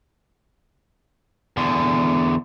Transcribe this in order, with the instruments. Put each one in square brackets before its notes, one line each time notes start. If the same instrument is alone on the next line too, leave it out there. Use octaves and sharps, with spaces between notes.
[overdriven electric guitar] E2 D3